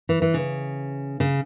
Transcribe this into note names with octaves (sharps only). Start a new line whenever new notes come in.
E3
E3
C#3
C#3